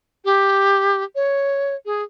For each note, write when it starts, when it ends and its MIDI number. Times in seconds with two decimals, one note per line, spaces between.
0.25 1.03 67
1.15 1.75 73
1.86 2.03 68